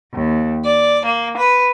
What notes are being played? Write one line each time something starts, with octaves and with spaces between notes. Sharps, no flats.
D#2
D5
A#3
B4